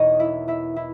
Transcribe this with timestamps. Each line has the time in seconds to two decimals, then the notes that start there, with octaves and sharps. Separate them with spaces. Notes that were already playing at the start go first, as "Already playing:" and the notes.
Already playing: E2 B2 A#3 D#4 C#5 D#5
0.19 E4 E5
0.48 E4 E5
0.76 E4 E5